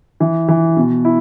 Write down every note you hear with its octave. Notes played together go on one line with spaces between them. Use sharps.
E3
E3
B2
E4